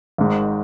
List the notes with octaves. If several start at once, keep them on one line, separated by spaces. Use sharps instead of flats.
G#1 G#2 D#3